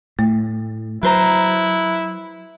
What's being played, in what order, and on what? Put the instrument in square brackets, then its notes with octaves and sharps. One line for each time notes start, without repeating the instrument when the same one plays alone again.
[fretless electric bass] A2 [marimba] A3
[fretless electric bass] F#3 [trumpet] E4 [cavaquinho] B4 C5 A#5